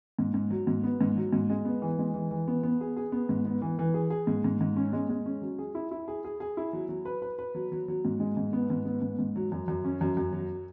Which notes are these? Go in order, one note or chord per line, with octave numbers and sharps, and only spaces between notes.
G#2
G#2
F#3
G#2
B3
G#2
F#3
G#2
G#3
B3
E3
G#3
E3
E3
B3
B3
G#4
G#4
B3
G#2
B3
E3
E3
G#4
G#4
G#2
G#2
G#2
C#4
G#3
G#3
C#4
F#3
G#4
E4
E4
G#4
G#4
G#4
E4
F#3
F#3
B4
B4
B4
F#3
F#3
F#3
G#2
G#3
G#2
B3
G#2
B3
G#2
G#2
F#3
F#2
F#2
C#4
F#2
F#2
F#3